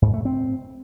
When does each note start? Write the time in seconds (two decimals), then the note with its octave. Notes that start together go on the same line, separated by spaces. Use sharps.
0.02 G#2
0.14 A3
0.25 C4